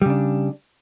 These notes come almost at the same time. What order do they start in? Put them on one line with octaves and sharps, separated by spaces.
G3 C#3 D4